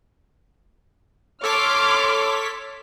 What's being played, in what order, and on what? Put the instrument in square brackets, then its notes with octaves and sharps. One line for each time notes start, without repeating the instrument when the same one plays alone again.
[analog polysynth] A4 C#5 B6 [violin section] C6 D6 F6